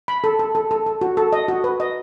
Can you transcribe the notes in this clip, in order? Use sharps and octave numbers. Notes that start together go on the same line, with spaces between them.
B5
A4
A4
A4
A4
A4
F#4
A4
D#5
F#4
B4
D#5